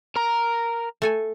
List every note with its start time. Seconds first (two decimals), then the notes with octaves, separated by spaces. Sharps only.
0.16 A#4 A#5
1.02 A3 A4 G#5